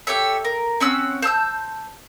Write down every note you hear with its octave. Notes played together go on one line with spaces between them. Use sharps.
G4 A4 C#5 E5
A#4
C4 C#4 F#5 E6
C5 A5 E6 G6